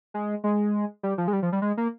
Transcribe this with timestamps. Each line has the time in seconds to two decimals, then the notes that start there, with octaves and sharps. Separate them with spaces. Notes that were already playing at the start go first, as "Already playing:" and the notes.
0.14 G#3
0.44 G#3
1.03 G3
1.18 F3
1.28 G#3
1.33 G3
1.42 F3
1.52 G3
1.62 G#3
1.77 A#3